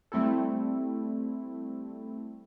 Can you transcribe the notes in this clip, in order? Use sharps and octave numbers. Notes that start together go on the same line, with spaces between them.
G3 A3 C4 E4 A4